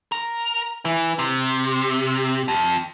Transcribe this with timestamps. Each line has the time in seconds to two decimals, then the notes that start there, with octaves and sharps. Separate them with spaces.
0.12 A#4
0.85 E3
1.19 C3
2.48 F2